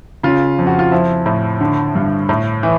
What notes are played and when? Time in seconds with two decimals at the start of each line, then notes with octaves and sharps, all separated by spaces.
0.23 C#3 F4
0.58 F2
0.67 F#4
0.79 F4
0.91 F3 E4
1.26 A2
1.61 D3
1.95 G2
2.29 A2
2.63 E3